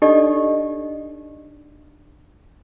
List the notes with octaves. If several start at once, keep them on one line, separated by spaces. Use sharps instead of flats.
D4 D#4 G4 A4 D5 D#5